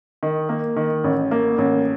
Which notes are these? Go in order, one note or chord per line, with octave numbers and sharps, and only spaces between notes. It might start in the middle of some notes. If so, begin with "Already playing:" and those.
D#3
A#3
D#3
A1
A#3
A1